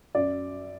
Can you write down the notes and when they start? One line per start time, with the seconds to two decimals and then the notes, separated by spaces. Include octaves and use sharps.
0.15 F#2 D5